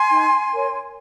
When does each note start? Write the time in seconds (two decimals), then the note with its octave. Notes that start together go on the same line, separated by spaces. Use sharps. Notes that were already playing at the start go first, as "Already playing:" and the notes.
Already playing: G#5 C6
0.11 D#4
0.52 A#4 C#5